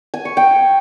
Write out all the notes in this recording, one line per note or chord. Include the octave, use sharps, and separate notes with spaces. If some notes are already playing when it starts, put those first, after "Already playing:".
G#5
C#6
G5